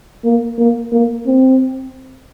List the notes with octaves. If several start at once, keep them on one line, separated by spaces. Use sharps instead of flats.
A#3
A#3
A#3
C4